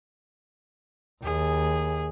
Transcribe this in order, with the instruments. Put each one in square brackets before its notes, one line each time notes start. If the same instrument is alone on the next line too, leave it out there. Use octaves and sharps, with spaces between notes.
[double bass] D#2 [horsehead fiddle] G#4